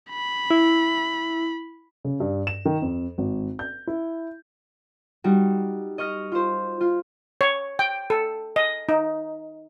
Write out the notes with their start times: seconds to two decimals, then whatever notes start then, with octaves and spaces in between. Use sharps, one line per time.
0.10 B5
0.51 E4
2.05 C#3
2.20 G2
2.47 E7
2.65 D#3
2.82 F2
3.18 G#1
3.59 G6
3.87 E4
5.24 G3 D#4 F#4
5.98 D#5 C#6 F6 A#6
6.32 F4 C5
6.81 F4
7.41 C#5
7.79 G5
8.10 A4
8.56 D#5
8.89 D#4